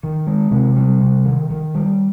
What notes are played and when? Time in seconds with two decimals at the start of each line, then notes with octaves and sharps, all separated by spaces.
0.03 D#3
0.27 G#3
0.51 C3
0.77 G3
1.01 C3
1.26 D#3
1.51 D#3
1.75 G3